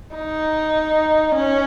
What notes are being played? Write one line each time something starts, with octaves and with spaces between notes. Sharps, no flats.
D#4
C#4